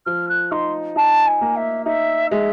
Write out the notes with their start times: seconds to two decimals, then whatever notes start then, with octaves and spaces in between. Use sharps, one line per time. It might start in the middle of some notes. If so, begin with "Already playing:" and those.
0.05 F3 F6
0.29 F#6
0.51 D#4 C6
0.96 D#4 A5
1.26 G#5
1.41 A#3
1.56 E5
1.86 D#4 E5
2.30 G#3 E5